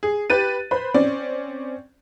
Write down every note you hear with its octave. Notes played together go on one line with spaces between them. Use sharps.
G#4
G4 B4 A6 D#7
B4 C5 B5
C4 C#4 D5